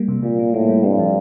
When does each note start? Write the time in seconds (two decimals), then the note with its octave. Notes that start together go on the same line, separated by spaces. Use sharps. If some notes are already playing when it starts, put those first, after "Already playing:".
Already playing: G3 A#3
0.08 C3
0.23 A#2 G3
0.39 A#3
0.54 A2 A#3
0.69 G3
0.84 G2 C4
0.99 F3